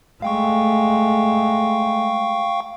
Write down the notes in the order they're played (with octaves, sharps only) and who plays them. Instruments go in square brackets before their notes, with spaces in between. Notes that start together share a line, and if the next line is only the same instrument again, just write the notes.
[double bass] G#3 A3 [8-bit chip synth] F5 G5 C#6